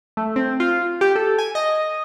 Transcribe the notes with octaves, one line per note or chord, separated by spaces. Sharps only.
A3
C4
F4
G4
A4
G#5
D#5